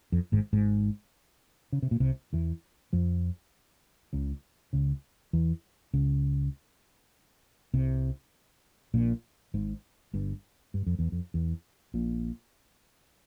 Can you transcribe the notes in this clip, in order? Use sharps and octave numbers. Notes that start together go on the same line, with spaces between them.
F2
G#1 G#2
G#1 G#2
C#3
C3
A#2
C2 C3
E2 E3
F2 F3
C#2 C#3
C#2 C#3
E2 E3
C#2 C#3
C2 C3
A#1 A#2
G#1 G#2
G1 G2
G2
F2
E2
F2
E2
A#1 A#2